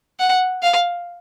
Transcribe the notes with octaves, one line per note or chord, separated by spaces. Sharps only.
F#5
F5